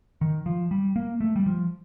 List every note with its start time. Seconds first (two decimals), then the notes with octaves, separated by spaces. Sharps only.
0.21 D#3
0.46 F3
0.71 G3
0.96 A#3
1.21 A3
1.36 G3
1.46 F3